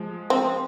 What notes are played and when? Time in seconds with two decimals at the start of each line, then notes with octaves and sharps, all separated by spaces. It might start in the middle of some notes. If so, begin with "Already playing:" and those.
Already playing: F3 G#3
0.30 C4